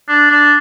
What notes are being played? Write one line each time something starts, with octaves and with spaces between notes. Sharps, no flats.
D4
D4